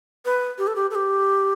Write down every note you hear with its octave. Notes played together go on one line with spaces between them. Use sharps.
B4
G4
A4
G4
A4
G4